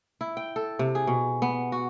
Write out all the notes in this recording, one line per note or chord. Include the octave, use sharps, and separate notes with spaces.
E4
G5
A4
C3
G#4
B2
B3
F#4